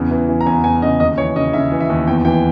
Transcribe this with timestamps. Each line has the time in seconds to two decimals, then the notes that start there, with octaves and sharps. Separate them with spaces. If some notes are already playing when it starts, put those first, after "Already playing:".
Already playing: E2 C#3
0.11 E3
0.29 E3
0.41 A#5
0.46 E2 G#5
0.64 E2 G#5
0.82 C#3 D#5
1.00 D#2 D#5
1.18 E3 C#5
1.36 C#3 D#5
1.53 C#3 E5
1.71 E3
1.80 E5
1.90 D#2
2.07 E2 G5
2.25 E3 G5